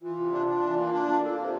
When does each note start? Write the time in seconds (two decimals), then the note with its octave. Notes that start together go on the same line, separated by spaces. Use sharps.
0.02 E3 F4
0.18 C3
0.33 D4
0.47 D4
0.63 E3
0.78 A#3
0.93 D4
1.08 A#3
1.22 A#3 A4
1.38 C3
1.44 C5